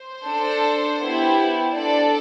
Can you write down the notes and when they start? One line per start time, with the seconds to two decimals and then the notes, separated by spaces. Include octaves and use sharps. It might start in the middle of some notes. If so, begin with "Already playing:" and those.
Already playing: C5
0.26 D4 A4
1.02 B3 E4 G4
1.76 D4 A4 D5